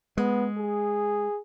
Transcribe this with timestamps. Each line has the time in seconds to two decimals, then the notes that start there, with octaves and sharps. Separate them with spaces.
0.17 G#3 B3
0.58 G#4